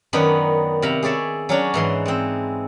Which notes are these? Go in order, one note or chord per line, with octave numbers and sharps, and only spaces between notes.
F#2 D#3 B3 D4 D#4 B4
C3 F5 A#5 B5
G#4 C#5 D5 E5
F#3 C#4 D4
G#2 E3 C6
G#3 C4